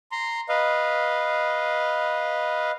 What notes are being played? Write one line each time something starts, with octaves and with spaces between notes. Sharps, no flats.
A#5 C6
B4 D#5 F5